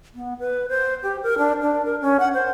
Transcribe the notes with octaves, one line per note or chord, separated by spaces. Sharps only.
B3
B4
C5
G4
A#4
D4
D4
A#4
C#4
F#5
C5